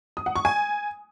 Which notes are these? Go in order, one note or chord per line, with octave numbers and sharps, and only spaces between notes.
D#6
F#5
C#6
G#5